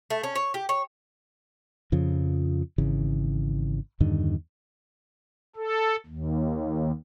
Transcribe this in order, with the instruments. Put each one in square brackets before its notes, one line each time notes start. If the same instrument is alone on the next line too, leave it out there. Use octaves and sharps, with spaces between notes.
[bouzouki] A3
C#4
C#5
G4
C#5
[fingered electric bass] F2 C#3 F3
G#1 C#3 E3
E2 G2 D3 D#3
[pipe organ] A4
D#2